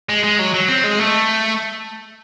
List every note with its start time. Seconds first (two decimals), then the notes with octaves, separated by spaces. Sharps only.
0.09 G#3
0.24 G#3
0.39 F#3
0.54 F#3
0.68 C4
0.84 G#3
0.99 A3